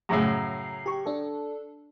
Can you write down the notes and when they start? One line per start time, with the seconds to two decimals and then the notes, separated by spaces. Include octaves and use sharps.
0.09 F#2 A2 C#3 A#5 C7
0.86 G4 C#6
1.06 D4 A4